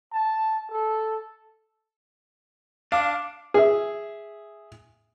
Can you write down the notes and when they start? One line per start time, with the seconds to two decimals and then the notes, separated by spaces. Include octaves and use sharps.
0.13 A5
0.71 A4
2.92 D4 F5 D6
3.54 G#4 E5